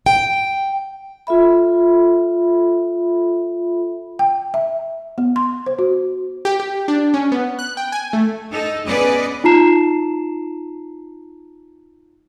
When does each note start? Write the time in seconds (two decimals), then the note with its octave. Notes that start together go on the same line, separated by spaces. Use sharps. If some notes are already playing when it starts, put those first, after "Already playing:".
0.06 G5
1.27 F4 A4 E5 B5
4.19 G5
4.54 E5
5.18 B3
5.36 C6
5.66 C5
5.79 F#4
6.45 G4
6.60 G4
6.88 D4
7.14 C#4
7.32 B3
7.59 F#6
7.77 G5
7.92 G#5
8.13 A3
8.51 D#4 A4
8.87 B3 C#4 G#4 B4 D5 D#5
9.44 D#4 F4 A5 A#5 C7 E7